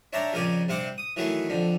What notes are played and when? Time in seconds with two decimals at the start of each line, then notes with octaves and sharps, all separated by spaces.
0.13 D4 C#5 E5 G5 A5 A#5
0.33 F2 C#3 A#4 D5 G#5
0.68 G2 C3 C4 F#5 D6
0.98 D#6
1.16 D#3 E3 F#3 A3 G#4
1.49 F2 D3